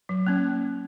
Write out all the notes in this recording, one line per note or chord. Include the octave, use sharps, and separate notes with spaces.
F#3
A#3 C#4